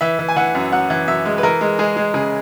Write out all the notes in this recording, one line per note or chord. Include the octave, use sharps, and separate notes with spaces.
E3 E5
E3
G#5
E3 F#5
F#2
F#2 F#5
E3
F#2 E5
G#3
B4
E3 A#4
G#3
G#3 G#4
G#3
C#3 G#4